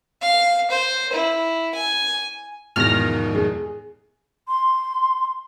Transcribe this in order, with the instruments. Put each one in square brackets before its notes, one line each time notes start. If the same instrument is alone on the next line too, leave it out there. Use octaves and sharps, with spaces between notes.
[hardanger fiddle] F5
C5
E4
G#5
[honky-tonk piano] E2 B2 [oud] G#2 D#3 F3 [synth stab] F6 A#6
[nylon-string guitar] G#4
[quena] C6